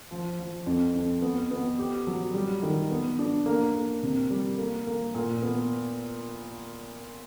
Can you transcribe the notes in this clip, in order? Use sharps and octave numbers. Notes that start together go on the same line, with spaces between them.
F3
F3
F2
F2
B3
B3
G4
F#3
G3
D#3
B3
D4
A#3
A#3
C3
G3
A#3
A#3
A#2
B3